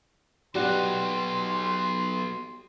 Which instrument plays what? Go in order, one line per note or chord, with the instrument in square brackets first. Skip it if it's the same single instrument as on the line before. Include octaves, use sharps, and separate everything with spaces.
[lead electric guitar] F#3 B3 [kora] G3 F#4 [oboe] C6